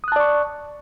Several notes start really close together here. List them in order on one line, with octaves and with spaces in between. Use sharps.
D#6 F#6 A5 D5 C#6